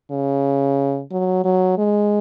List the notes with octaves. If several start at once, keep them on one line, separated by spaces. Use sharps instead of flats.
C#3
F#3
F#3
G#3